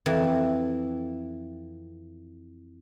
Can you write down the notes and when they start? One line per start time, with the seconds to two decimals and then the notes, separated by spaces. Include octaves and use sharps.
0.06 F2 E3